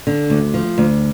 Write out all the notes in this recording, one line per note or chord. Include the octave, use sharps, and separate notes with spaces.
D3
D2
F3
D2